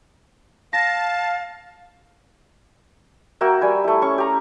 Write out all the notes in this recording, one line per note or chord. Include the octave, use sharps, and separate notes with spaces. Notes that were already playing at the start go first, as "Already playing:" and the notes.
F5 A5 A#6
A#3 F#4 E5 G5
G3 G#5 B5
A3 E4
C#4 C#6
G4 A#5